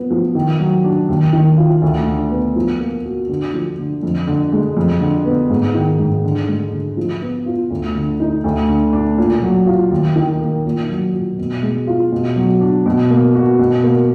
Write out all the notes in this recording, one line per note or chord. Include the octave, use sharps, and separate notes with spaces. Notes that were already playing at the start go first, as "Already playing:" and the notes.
Already playing: F3 B3
F3
D#3
F#3
D4
D#2
D#3
F4
D2
D3
B3
F3
A#3
F#4
D3
F3
D3
F2
D3
G#3
F2
D3
B3
G#2
D#3
G#2
D3
G#3
D3
F3
B3
F4
D2
D3
D#4
D2
D3
D4
A#2
F#3
F4
D#2
D#3
A#3
A#2
F#3
A#2
B2
G#3
F4
B2
F#3
D4
B2
A#3
F#4
B2
A#3